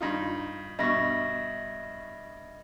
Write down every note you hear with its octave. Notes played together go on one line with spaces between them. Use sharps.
G2 D#4 F4
G2 B2 D#5 E5 C#6 A#6